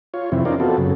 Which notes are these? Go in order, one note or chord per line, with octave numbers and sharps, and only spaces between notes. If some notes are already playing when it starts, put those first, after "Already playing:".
F4 C#5
F2 C3 E3 C4 E4
C#4 D#4 F4 A#4 C5 D5
B3 C4 F4 F#4 A4
F#2 C#3